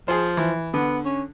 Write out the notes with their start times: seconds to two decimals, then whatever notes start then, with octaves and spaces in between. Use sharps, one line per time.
0.08 F3 G#4 C5
0.37 E3
0.74 D3 B3
1.05 C#4